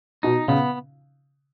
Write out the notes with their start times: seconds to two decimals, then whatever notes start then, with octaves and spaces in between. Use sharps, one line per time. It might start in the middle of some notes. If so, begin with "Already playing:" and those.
0.23 B2 D#4
0.48 C#3 B3